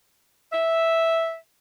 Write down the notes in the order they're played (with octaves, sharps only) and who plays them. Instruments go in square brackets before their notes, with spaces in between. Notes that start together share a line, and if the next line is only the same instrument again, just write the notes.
[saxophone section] E5